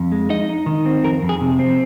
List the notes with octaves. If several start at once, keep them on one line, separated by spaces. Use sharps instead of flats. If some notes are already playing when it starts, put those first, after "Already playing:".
Already playing: F2
G#3
D#4 D#5
D#4
D#3
C4
F2 A#4
F2
G#4
C3
C4